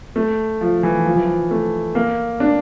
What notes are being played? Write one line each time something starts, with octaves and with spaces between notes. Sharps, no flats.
A3
F3
E3
F3
E3
F3
A3
A#3
D4